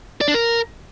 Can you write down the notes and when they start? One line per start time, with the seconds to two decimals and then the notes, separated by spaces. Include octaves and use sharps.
0.21 D5
0.28 D4
0.34 A#4